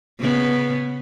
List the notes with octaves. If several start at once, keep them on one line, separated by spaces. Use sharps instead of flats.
C#3 B3